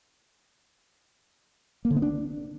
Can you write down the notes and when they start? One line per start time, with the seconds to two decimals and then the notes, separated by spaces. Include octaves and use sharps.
1.85 A#3
1.90 D3
1.96 B3
2.02 D4